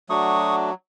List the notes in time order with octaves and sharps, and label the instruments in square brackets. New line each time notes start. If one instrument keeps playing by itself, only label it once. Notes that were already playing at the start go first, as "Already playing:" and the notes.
[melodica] F#3 A3 D4 F#4 C#6 D#6